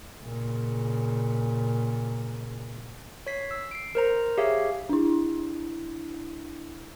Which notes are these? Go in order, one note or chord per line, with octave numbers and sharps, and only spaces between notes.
A#2 C#3
C#5 B6 C7
E6
C7 D7
A#4 C5 A#5
G4 G#4 C#5 E5 F5
D4 E4